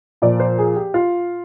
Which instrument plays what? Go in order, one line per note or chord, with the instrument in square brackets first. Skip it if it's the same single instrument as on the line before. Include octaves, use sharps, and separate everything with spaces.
[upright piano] A#2 F3 D5
C5
G#4
G4
F4